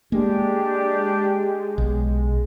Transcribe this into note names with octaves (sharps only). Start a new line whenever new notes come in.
G#3 A#3 D4 G4
B1